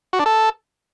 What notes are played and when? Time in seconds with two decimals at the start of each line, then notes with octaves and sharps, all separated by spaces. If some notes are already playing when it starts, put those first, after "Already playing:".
0.13 F#4
0.19 D4
0.26 A4